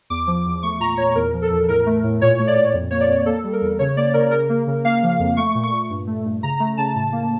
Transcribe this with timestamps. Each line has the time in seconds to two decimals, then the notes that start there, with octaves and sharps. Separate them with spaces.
0.10 E2 D6
0.27 F3
0.46 E2
0.63 A3 C#6
0.80 A#2 A#5
0.98 A#2 C#5
1.15 E2 A#4
1.33 F3
1.42 A4
1.51 E2
1.69 A2 A#4
1.86 A3
2.04 A2
2.21 A#2 C#5
2.39 A3
2.47 D5
2.56 A#2
2.73 F2
2.91 A#3 C#5
3.01 D5
3.09 F2
3.26 A#3 A4
3.44 G3
3.53 A#4
3.61 E2
3.79 C#3 C#5
3.97 A#3 D5
4.14 C#3 A#4
4.31 C#3 A#4
4.49 A#3
4.67 C#3
4.85 A#3 F5
5.03 F3
5.19 F2
5.37 A3 C#6
5.55 A#2
5.64 C#6
5.73 A#2
5.90 G2
6.07 A3
6.26 G2
6.43 C#3 A#5
6.60 A3 A#5
6.78 C#3 A5
6.95 A2
7.12 A#3